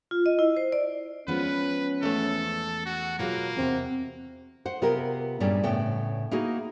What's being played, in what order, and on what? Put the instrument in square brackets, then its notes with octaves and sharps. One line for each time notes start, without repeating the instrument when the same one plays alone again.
[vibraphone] F4
D#5
E4
C5
D5
[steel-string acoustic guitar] F3 G#3 B3 [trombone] C#4 [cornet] B4
[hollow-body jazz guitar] E2 A3 [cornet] A4
[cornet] F#4
[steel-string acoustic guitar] B2 F4 G#4 [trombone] F#3 [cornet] A#3
[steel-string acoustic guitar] E2 C3 F#4 [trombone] C4
[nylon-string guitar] C5 F#5
C3 B3 F4 G4 G#4 A#4
G2 A#2 G3 C#4 G#4 D5
A2 C#3 B3 G5
A#3 D#4 E4 F#4 G#4